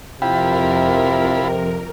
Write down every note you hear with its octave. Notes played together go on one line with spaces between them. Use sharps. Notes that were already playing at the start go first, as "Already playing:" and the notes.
F2 C3 E4 F4 A#4 G5 B5